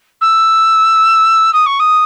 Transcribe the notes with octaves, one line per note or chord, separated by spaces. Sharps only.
E6
D#6
C#6
D#6